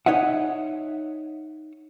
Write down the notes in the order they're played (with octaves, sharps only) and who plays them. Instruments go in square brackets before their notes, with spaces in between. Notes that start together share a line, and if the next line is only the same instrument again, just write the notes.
[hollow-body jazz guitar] D#4 C#5 D#5 E5 F#5